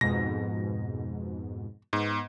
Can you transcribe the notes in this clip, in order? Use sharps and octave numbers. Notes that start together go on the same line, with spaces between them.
F2 G#2 B2 A#6
G#2 B3